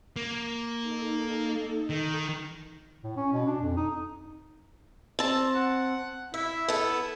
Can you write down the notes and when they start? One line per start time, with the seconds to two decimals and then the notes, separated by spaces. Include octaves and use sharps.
0.16 A#3
0.82 D#4 A4
1.90 D#3
3.04 A2
3.17 C#4
3.33 B2
3.46 D4
3.61 F2
3.77 D#4
5.19 C4 A5
5.55 F#5
6.34 E4 E5
6.68 B3 A4